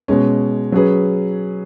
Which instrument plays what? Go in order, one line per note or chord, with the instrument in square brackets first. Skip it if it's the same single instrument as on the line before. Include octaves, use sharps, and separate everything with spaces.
[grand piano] B2 G#3 C#4
F#3 C#4 G#4 B4